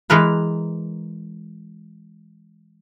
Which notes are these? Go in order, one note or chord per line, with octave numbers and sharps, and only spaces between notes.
E3 G#3 A#4 B4